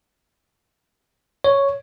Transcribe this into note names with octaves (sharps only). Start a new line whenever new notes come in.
C#5